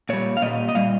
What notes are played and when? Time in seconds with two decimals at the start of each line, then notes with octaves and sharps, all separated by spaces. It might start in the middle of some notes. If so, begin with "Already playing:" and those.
0.09 A#2 G3 C#5
0.37 F5
0.42 A#2 G3 D#5
0.69 D#5
0.75 A#2 G3 F5